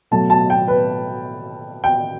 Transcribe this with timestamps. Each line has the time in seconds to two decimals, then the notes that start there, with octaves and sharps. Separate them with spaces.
0.11 B2 F#3 A3 A5
0.30 A5
0.50 G5
0.68 B4
1.84 G5